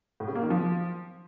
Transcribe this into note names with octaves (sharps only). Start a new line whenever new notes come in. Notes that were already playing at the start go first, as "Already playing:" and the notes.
A2
C#3
A#3
D#3
F3